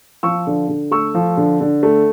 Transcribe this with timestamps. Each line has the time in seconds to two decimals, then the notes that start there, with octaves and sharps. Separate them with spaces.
0.23 F3 C#6 E6
0.47 D3
0.69 D3
0.91 A3 C#6 E6
1.15 F3
1.37 D3
1.61 D3
1.83 A3